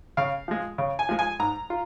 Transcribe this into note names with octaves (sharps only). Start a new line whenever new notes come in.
C#3 F5
F3 G#3
C#3
G#5
F3 G#3
G#5
G#2 A#5
F4